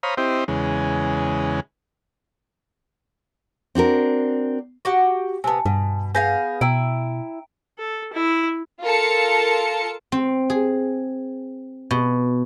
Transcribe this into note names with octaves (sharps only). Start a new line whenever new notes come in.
C5 C#5 F5 A#5 B5 D#6
C4 E4 G4 C5 D#5
E2 C#3 G#3
C4 D4 F#4 A#4
F#4 G4 F#5
C3 B3 G#5 A5
G2 B2
B3 G#4 F5 G#5 G6 A#6
B2 E4 G5 A#5 D7
A4
E4
F4 A4 A#4 A5 C#7
C4
G#4
B2